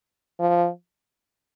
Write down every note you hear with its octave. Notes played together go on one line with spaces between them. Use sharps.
F3